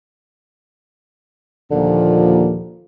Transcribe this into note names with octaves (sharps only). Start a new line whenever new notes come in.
D#2 A#2 D3 F3